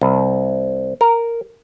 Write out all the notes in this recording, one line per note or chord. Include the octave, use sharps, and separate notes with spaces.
C2
A#4